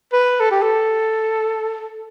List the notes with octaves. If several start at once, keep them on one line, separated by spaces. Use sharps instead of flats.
B4
A4
G4
A4